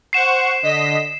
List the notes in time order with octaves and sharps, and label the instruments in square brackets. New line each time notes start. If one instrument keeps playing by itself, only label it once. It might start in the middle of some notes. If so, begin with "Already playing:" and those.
[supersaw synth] C5 F#5 C#6 [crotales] C7 E7
[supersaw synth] D3 D#5 B6